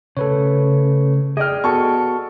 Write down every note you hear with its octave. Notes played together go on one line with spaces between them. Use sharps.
C#3 A3 A4 B4 C#5
G#4 D5 D#5 G5 F6
B3 F#4 A4 C#6